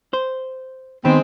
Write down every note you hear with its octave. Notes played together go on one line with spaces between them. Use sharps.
C5
D#3 G#3 B3 C4